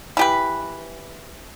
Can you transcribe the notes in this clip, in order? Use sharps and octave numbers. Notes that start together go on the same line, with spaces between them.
E3 G4 B4